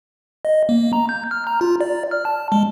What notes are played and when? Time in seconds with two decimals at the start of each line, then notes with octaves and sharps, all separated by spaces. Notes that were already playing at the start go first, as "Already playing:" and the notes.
0.45 D#5
0.69 A#3
0.93 A#5
1.09 G6
1.31 F6
1.47 A#5
1.61 F4
1.81 D5
2.11 F6
2.25 A5
2.52 G#3